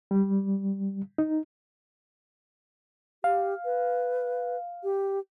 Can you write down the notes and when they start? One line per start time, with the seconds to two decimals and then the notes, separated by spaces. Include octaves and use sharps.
0.11 G3
1.18 D#4
3.24 G4 F5
3.65 B4
4.84 G4